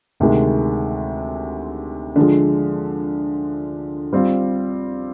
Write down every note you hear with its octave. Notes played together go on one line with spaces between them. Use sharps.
D2 C3 D#3 G#3
D3 F3 G#3
G3 C4 F4